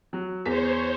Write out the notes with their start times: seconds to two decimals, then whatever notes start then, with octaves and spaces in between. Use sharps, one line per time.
0.13 F#3
0.46 E2 C5 C#5 B6